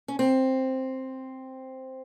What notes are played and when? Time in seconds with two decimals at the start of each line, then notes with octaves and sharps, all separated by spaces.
0.08 C#4
0.19 C4